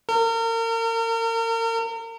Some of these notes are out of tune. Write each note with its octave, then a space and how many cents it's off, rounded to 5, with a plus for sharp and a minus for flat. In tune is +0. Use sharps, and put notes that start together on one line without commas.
A#4 -35